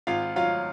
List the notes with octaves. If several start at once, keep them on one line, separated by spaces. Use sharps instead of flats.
G#1 F4 F5
F#3 F4 F5